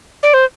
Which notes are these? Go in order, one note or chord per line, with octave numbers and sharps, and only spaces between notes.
D5
C5